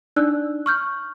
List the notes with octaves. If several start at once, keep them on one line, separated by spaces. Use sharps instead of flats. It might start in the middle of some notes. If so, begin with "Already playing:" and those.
D4 D#4 D5 E6 F#6
C#6 F6 G6